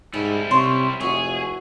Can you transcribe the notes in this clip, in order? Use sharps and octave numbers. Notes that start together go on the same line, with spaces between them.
G#2 G3 E4 G#4 A4
C3 C#4 C#5 C6
F1 E4 F#4 G#4 C#5